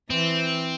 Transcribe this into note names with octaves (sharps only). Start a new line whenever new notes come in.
E3 C4